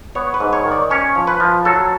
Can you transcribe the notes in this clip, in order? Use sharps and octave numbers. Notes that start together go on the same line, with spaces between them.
B3 C#5
B4
G#2
C#5
D#3
D5
C#4 C#5
F3
B4
F3
F#3 A4